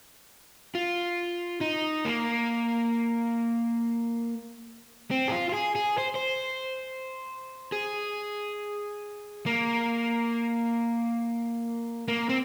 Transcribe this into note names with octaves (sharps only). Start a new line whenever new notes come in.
F4
D#4
A#3
C4
G#4
F4
F4
G#4
G#4
C5
C5
G#4
A#3
A#3
C4